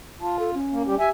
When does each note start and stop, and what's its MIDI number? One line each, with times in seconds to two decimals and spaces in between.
0.21 0.55 65
0.21 0.37 81
0.39 0.54 69
0.54 0.99 61
0.72 0.83 58
0.87 0.95 55
0.87 0.95 67
0.99 1.11 67
0.99 1.09 76
0.99 1.09 80